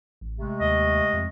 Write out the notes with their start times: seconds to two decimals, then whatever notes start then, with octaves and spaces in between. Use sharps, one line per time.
0.21 A1
0.39 C3 G#3 A3
0.60 D#2 D#5
1.13 F2